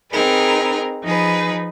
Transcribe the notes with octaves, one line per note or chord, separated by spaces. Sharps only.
C4 D#4 G#4 A#4 B4
F3 D#4 G#4 B4